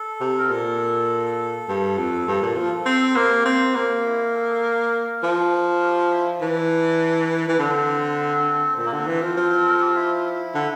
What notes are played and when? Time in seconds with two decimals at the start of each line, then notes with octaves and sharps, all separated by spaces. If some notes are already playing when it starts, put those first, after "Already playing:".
Already playing: A4
0.21 C3
0.38 A#4
0.49 A#2 A4
1.69 G2
1.98 F2
2.27 G2
2.42 A#2
2.57 F3
2.86 C4
3.01 A4
3.16 A#3 G4
3.31 G4
3.45 C4
3.75 A#3
4.05 E4
4.23 A#4
4.34 A4
4.49 A4
4.63 A#4
5.23 F3
5.82 G4
5.97 F4
6.12 E4
6.26 D4
6.41 E3 D4
7.48 E3
7.59 D3 C4
8.78 A#2 C4
8.85 A#3
8.92 D3 C4
9.07 E3
9.22 F3
9.37 F3
9.67 A#4
9.74 A4
9.81 G4
9.89 F4
9.96 E4
10.55 D3